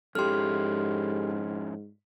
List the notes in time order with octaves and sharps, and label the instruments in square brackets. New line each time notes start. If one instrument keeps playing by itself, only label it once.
[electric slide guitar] F2 C#4 E4 [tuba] G#2 [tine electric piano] G4 A4 [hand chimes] C6 F6